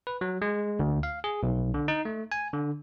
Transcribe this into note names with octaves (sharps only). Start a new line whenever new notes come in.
B4
F#3
G#3
D2
F5
G#4
B1
D3
D#4
A3
G#5
D3